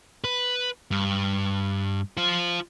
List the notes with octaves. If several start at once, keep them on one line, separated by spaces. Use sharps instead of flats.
B4
G2
F4 C5